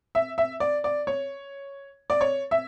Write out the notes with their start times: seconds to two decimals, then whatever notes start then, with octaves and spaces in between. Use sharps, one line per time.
0.15 E5
0.38 E5
0.60 D5
0.84 D5
1.07 C#5
2.10 D5
2.21 C#5
2.51 E5